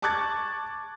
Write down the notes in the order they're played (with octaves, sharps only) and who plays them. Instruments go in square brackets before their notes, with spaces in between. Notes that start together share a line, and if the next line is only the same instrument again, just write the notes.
[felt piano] A5 C#6 D6 F#6 G#6 A6